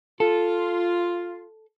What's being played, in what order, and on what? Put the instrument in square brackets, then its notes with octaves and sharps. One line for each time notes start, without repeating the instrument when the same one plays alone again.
[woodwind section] F4 [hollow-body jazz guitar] A4